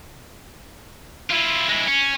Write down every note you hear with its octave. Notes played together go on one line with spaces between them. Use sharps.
E4 F4
G#3 E4
C#4